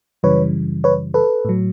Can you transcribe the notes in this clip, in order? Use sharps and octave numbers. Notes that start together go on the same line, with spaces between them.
F#2 C#3 E3 G3 B4 C#5
B4 C#5
A4 B4
A2 F#3